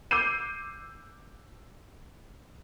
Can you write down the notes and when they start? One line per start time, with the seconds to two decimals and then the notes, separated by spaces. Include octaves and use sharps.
0.11 D6 E6 G6 C7 D#7